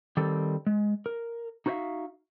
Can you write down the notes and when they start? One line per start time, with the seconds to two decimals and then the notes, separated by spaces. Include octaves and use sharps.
0.17 D#3 G3 C4 A4
0.66 G#3
1.06 A#4
1.66 D#4 F#4 B4 C5 E5 F5